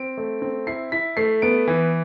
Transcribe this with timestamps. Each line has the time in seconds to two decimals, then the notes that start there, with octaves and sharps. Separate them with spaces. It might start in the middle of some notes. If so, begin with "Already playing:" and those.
Already playing: C4 D7
0.18 A3
0.42 C4
0.67 E4 C7
0.92 E4 B6
1.17 A3 C7
1.42 B3 D7
1.68 E3